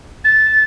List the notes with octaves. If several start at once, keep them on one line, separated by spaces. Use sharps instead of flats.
A6